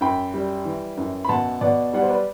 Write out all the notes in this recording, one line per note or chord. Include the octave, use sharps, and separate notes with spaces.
F#2 G5 B5
G3
E3
F#2
B5
B2 F#5 A5
B2 D5 F#5
G3 D5 F#5
C5
B4 D5